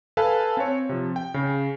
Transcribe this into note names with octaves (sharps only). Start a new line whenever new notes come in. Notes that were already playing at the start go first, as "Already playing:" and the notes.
A4 B4 F5 G#5 A5
C4 C#5
C3 F3
G5
C#3